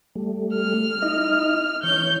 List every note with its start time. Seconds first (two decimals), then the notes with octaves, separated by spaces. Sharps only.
0.15 G3 A3
0.55 F6
1.02 D#4 E4 D#5
1.83 E3 C#5 G6